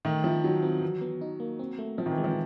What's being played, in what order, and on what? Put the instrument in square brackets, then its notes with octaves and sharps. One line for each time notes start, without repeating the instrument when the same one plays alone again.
[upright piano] D#3 [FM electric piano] A3
[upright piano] F3 [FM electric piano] E4
[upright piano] F#3 [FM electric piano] D#4
[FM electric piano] C4
E3
B3
D#4
A#3
C4
A3
[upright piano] F3 [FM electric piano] C4
[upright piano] D#3
E3
[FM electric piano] G#3
[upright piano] F3